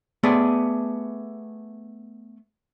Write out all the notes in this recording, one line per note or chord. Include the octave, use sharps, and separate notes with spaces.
A3 B3 G#4 D5